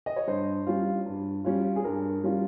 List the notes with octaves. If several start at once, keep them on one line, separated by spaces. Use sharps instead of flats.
D#5
C#5
G2 C5
G3 C#4 F4
G2
G3 C#4 F4
G#4
G2 A#4
G3 C#4 F4